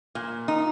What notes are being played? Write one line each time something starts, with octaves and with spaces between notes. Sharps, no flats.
A#2
D#4